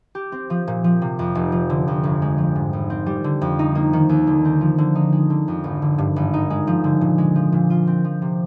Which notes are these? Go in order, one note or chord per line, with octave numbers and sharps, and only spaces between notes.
G4
C4
F3
A#2
F3
C3
F2
F1
F3
D3
F2
G1
G#3
F3
G#2
G#1
C4
G3
D3
F2
D#4
A#3
D#3
D#2
D3
C4
F3
D3
D#4
G#3
D3
F2
G#1
D3
G2
G#1
D#4
G#3
F3
D3
A#2
G#3
F3
A#2
F4
C4
F3
C3